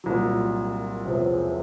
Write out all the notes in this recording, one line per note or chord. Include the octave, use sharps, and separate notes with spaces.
C2 A#2 F#3
E1 E2 C3 F3